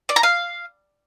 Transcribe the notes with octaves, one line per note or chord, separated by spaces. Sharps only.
D5
A#5
F5